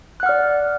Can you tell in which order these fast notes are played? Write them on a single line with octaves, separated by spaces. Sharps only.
F#6 F#5 F6 D5